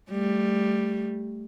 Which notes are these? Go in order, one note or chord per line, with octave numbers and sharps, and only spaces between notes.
G3 A3